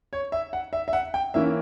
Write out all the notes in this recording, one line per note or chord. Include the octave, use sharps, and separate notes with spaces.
C#5
E5
F#5
E5
E5
F#5
G5
E3 A#3 C#4 E5